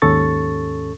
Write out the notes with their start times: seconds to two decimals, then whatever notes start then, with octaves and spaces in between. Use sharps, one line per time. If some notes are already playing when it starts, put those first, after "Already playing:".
0.02 D#2 G#2 C#4 A4 C#6 A6